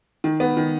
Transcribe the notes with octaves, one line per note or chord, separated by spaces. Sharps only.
D#3
B3
D#3